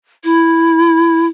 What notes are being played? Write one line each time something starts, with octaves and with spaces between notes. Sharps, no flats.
E4